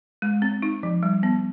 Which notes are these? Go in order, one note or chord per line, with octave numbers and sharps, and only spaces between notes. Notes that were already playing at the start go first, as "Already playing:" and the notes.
G#3
C4
D#4
F3
G3
B3